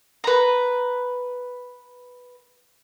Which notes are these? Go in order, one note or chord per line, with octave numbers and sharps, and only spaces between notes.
B4 A#5